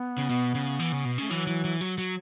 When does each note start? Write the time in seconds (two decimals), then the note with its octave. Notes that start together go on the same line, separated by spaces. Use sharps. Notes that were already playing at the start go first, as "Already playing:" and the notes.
Already playing: B3
0.18 C#3
0.29 B2
0.55 C#3
0.80 E3
0.92 C#3
1.05 B2
1.18 C#3 A3
1.30 E3 F#3
1.47 E3
1.64 E3
1.81 F#3
1.98 F#3